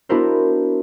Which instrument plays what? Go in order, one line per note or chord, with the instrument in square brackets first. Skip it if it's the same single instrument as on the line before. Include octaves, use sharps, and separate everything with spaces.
[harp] B3 D4 E4 F#4 A#4 C5